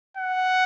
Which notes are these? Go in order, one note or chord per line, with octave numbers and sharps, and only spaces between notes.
F#5